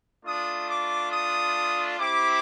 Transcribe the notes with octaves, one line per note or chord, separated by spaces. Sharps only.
A3 D4 F4 D#6
D6
D#6
C4 E4 G4 D6